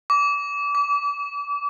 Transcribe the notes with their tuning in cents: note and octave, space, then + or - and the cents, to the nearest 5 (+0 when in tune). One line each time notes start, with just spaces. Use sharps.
D6 -30
D6 -40